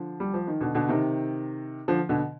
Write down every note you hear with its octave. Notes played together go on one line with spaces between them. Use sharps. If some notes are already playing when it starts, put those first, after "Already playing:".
Already playing: D3 F3
G3
F3
D#3
B2 D3
B2 D3
C3 D#3
D3 F3
B2 D3